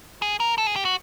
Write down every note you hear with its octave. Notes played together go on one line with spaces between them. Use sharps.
G#4
A#4
A4
G#4
G4
F#4